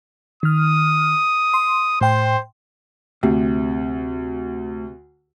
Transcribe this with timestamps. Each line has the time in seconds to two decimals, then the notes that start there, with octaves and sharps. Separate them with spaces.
0.43 D#3 D#6 F6
1.54 C6
2.01 A2 C5 G5 C6
3.23 D2 C3